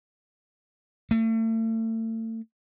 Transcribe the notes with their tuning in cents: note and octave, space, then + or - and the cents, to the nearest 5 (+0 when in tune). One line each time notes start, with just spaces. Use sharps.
A3 +35